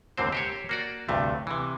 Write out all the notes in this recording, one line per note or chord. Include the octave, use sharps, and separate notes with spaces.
D#2 G#2 D3 C4 C5
G4 C5 C#5
A#3 F#4 D5
D2 G2 C3 A3
C3 E3